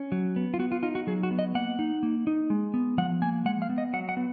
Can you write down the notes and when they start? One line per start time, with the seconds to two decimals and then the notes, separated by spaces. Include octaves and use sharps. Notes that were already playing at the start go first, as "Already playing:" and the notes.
Already playing: C#4
0.12 F#3
0.36 B3
0.54 F4
0.59 B3 F#4
0.72 F4
0.83 D#4 F4
0.95 F#4
1.07 F#3 G#4
1.23 F#4
1.31 B3
1.39 D#5
1.55 A#3 F#5
1.79 D#4
2.03 A#3
2.27 D#4
2.50 G#3
2.74 B3
2.98 F3 F#5
3.22 A#3 G#5
3.45 G#3 F#5
3.62 F5
3.69 B3
3.78 D#5
3.93 F#3 F#5
4.09 F#5
4.17 B3